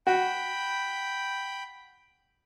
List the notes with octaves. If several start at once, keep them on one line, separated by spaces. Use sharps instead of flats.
F#4 G5 B5